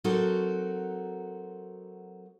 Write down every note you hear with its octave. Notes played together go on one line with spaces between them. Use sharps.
F#3 C4 D#4 F#4 A4 A#4